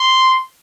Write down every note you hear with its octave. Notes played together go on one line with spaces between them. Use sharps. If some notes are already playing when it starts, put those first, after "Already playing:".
Already playing: C6